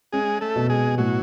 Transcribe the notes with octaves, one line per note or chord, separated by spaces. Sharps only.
G#3 C#4 G#4
A3 A4
B2
G#3 G#4
A2 F#3 F#4